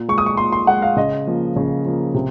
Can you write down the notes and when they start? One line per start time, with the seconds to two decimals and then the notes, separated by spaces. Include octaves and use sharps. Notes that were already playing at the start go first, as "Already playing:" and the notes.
Already playing: A#2
0.09 G#3 C#6
0.18 D#6
0.26 C#6
0.37 A#2 C6
0.52 C6
0.67 G#3 F#5
0.82 F5
0.97 C#3 D#5
1.27 F3 A#3
1.56 C#3
1.85 F3 A#3
2.14 C3